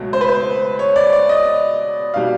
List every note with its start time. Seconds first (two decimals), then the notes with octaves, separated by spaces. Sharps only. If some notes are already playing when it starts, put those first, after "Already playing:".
Already playing: C#2 B2 F#3 A3
0.13 C5
0.21 B4
0.29 C5
0.79 C#5
0.96 D5
1.13 D5
1.29 D#5
2.14 B2 G3 F5